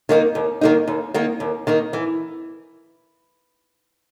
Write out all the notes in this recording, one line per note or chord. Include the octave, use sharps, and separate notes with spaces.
D#3 A#3 D#4
D#2
D#3 A#3 D#4
D#2
D#3 A#3 D#4
D#2
D#3 A#3 D#4
E3